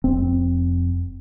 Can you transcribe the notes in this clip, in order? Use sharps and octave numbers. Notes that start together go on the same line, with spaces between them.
F1 C4